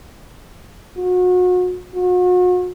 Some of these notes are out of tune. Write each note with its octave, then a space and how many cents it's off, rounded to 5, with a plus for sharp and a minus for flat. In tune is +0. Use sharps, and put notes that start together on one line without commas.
F#4 -35
F#4 -40